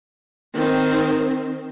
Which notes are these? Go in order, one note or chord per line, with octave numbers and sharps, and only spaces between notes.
D#3 C4